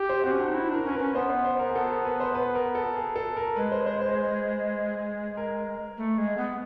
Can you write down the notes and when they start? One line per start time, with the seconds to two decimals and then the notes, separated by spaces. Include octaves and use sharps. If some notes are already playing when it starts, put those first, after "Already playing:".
Already playing: G4
0.09 C5
0.23 C4 F#4
0.32 C#4
0.39 D4 F#4
0.47 D#4
0.54 E4 F#4
0.69 D4 A#4
0.84 C#4 A#4
0.94 C#4 B4
1.15 B3 C5
1.30 C5
1.45 C5
1.59 A#4
1.70 G#4
1.75 B3 A4
1.90 A#4
2.05 B4
2.20 C5
2.35 B4
2.55 A#4
2.75 A4
2.96 G#4
3.16 A4
3.37 A#4
3.56 G#3 B4
3.72 C5
3.86 C5
4.01 C5
5.37 A#4
5.97 A3
6.18 G#3
6.38 B3